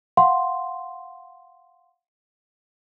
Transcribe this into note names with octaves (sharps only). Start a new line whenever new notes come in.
F5 F#5 C6